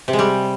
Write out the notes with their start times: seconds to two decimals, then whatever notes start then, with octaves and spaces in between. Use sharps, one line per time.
0.08 C3
0.13 G#3
0.19 G3